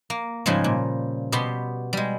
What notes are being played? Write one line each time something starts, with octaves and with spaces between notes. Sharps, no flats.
A#3
G#2 C#3 F3 G3 G#3
A#2
B2 B3 G4 C6
G3 G#3